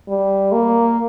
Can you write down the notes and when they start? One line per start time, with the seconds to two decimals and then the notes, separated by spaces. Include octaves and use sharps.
0.09 G3
0.52 A#3